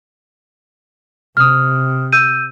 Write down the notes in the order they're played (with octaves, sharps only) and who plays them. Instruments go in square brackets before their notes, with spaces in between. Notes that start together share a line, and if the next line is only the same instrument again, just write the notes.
[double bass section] C3 [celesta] D#6 F6
[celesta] E6 G6 D#7